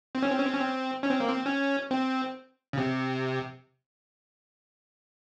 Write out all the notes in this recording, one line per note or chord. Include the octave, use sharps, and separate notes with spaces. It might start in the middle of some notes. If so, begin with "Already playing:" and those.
C4
C#4
C4
C#4
C4
C#4
C4
C#4
C4
A#3
C4
C#4
C4
C#3
C3